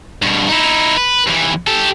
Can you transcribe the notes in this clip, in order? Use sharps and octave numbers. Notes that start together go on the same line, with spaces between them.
G2 B2
D#4 E4
B4
D#2 E3
G4 A4